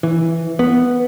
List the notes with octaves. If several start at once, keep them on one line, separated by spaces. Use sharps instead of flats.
E3
B3